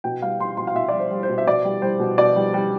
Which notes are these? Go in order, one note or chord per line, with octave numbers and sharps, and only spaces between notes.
B2 G5
G3 F5
G3 C6
B2 C6
F5
B2 E5
G3 D5
C5
G3
C5
B2
E5
B2 D5
G3
G3 C5
B2
B2 D5
G3
G3